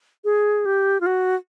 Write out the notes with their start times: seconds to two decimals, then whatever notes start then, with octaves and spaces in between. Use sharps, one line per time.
0.25 G#4
0.66 G4
1.01 F4
1.06 F#4